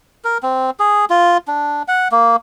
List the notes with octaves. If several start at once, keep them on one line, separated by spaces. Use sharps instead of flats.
A#4
C4
G#4
F4
D4
F#5
A#3